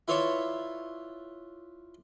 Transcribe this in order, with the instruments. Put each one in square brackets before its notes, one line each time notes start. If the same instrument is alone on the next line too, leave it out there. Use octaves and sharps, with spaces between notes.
[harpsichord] E4 F4 B4 C#5 D5 E5